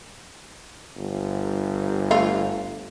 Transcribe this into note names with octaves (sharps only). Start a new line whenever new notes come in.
G1
A3 F4